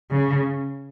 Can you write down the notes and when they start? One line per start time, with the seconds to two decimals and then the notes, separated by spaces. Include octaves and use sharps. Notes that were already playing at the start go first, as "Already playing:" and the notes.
0.11 C#3